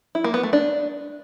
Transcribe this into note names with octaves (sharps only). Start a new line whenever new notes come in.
E4
A#3
B3
A3
D4